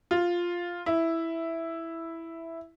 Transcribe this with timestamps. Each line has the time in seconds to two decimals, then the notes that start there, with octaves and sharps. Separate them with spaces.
0.11 F4
0.86 E4